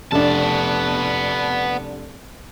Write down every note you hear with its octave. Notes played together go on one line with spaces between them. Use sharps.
F1 B3 D4 A5